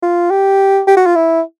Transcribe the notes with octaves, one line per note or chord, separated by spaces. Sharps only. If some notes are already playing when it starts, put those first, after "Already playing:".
F4
G4
G4
F#4
F4
E4